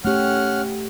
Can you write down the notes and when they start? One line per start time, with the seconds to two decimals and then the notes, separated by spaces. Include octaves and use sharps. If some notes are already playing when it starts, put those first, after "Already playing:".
0.05 A3 C#4 G4 F#5 F6